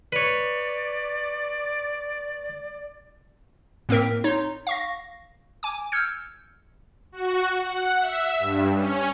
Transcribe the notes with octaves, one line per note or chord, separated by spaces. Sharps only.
B4 C#5 D5
A2 A#3 C4 A#4 B6
D#4 C#5 C6
F5 C#6 A#6
G#5 D6
E6 F6 G6 G#6 C#7
F#4
F#5
E5
G2
C#4